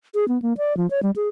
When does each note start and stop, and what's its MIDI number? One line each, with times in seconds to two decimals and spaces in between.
0.15 0.25 68
0.28 0.41 59
0.42 0.53 58
0.57 0.76 74
0.77 0.89 53
0.90 1.00 73
1.03 1.11 55
1.16 1.29 68